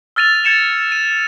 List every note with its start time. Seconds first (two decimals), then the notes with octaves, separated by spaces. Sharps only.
0.16 E6 F6 A6 D#7 F7
0.44 G#6 A6 C#7 E7 F7
0.92 D#7